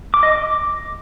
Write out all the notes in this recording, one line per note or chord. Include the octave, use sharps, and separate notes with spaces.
D6
D#5
D6